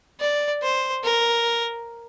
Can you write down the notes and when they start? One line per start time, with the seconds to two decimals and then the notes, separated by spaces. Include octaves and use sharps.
0.20 D5
0.63 C5
1.04 A#4